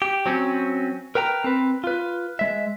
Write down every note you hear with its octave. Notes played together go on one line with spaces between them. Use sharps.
G4
F#3 C4 C#4
A#4 B4 G5 A#5
C4 B4
F4 B4
G#3 E5